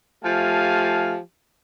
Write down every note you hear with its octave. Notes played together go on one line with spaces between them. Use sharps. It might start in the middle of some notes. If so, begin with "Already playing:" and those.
F3 A3 G4 F5 G#5 A5